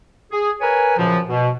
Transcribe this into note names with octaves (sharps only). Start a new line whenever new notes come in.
G#4
A#4 B4 C#5 G#5
F#2 A#2 C#3 F3
B2